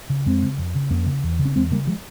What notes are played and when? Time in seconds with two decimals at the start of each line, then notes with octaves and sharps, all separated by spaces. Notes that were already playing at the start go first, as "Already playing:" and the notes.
0.10 C#3
0.26 F2 G#3 C4
0.43 C#3
0.58 F2
0.75 C#3
0.90 F2 A#3 C#4
1.06 C#3
1.23 E2
1.39 C#3
1.45 C#4
1.55 E2 G#3 C4
1.71 C#3 G3 A#3
1.87 F3 G#3